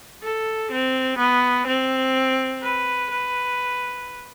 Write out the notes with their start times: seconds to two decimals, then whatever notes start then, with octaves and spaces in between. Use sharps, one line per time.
0.22 A4
0.72 C4
1.18 B3
1.67 C4
2.63 B4
3.11 B4